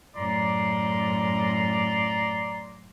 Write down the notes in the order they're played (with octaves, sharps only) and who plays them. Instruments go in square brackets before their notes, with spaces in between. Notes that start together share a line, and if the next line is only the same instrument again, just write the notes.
[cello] F#2 A2 [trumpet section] D5 A#5 C6